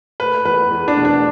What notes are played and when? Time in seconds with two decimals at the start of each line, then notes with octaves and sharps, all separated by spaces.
0.20 A3 B4
0.45 E2 B4
0.70 E2
0.88 D4
0.97 B2
1.05 D4